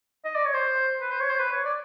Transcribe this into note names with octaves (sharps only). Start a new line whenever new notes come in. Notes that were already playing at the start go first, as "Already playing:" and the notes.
D#5
D5
C#5
C5
B4
C5
C#5
C5
B4
C#5
D5